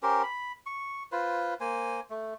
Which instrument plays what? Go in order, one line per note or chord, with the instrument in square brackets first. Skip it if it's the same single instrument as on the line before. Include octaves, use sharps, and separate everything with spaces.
[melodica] C#4 G4 A#4 C5
B5
C#6
F4 B4 C5
A#3 C5 G#5
A3